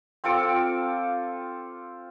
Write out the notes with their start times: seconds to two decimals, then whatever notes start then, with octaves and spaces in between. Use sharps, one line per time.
0.24 C4 F4 A4 D6